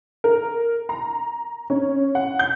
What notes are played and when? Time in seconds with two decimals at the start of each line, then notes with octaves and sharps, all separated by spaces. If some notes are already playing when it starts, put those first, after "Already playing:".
0.24 A#4
0.89 A#5
1.70 C#4
2.15 F#5
2.39 G6